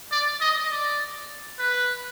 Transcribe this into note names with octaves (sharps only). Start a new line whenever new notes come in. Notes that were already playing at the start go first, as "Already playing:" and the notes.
D5
D#5
D5
B4